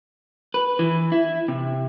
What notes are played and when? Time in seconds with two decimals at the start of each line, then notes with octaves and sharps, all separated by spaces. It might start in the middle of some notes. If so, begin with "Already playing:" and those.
0.54 B4
0.79 E3
1.12 E4
1.48 C3